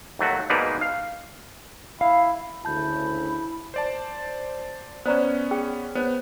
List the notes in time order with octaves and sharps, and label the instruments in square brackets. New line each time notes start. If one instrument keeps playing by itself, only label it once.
[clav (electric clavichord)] D#2 F#3 A3 F#4
G#2 B2 A#3 D#4 B4 D5
F5
[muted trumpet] E4 [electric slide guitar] F5
[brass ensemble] D2 C#3 [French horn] E4 [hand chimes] A5 G6 [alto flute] B5
[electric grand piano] C5 D5 A5
[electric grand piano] B3 C#4 [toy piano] C5 D5 A#5
[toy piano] G#4 G5
[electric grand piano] B3 [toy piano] C5 C#5